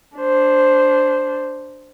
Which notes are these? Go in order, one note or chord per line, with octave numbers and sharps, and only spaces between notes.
D4 C5